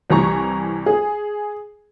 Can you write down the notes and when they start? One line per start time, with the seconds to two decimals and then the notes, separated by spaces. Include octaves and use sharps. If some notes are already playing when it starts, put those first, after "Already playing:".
0.10 C2 E3 G4 A#5 C#6
0.86 G#4